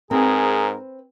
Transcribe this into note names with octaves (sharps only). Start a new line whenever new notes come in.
G#2 C4 G#4 A#4 B4